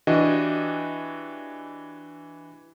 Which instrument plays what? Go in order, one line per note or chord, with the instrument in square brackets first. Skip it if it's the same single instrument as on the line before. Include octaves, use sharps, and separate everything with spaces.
[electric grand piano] E3 D4 F#4 G4 D#5